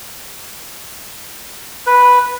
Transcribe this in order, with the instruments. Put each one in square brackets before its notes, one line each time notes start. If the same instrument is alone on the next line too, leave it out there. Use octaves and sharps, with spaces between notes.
[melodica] B4